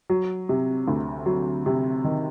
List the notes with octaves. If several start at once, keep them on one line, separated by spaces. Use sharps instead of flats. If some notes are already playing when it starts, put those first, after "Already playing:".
F#3
C3
D2
F#3
C3
D#3